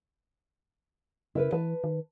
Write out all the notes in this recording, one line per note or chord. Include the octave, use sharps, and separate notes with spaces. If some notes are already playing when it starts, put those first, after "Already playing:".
C#3 E4 A#4 B4
E3 B4 A5
D#3